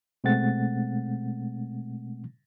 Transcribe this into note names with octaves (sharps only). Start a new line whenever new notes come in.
B2 G#3 A3 C4 F#5 A6